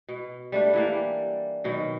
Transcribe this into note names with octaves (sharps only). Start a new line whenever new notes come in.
B2
G3 A3 D4
E3 G3 A#3
B2 D#3 F#3